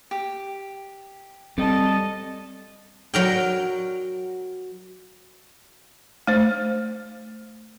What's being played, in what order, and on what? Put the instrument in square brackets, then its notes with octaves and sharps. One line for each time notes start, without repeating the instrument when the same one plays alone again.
[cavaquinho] G4
[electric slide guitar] G3 A4 [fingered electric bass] C4 [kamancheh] D#5 A5
[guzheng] F#3 A#4 G5
[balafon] A3 C5